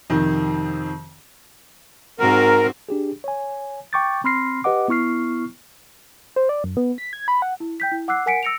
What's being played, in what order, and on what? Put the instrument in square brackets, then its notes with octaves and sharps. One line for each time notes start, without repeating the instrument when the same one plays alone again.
[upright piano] F2 C3 D#3
[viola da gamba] G#2 C4 F#4 [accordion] A#4
[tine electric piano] D4 G4 G#4
C#5 G#5
G5 C#6 D6 G6 A6
C4 B5 C6 F6 A#6 C7
G4 B4 D#5 F#5 D6
B3 E4 C#6 F6 C7
[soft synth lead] C5
D5
F#2
B3
B6
G#6
B5
F#5
[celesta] E4
G5 G6 B6
E4
F#5 D6 E6 F#6 C7
A#4 F#5 G#5 B6 C#7 D7
E6 A#6 C#7 D7 F7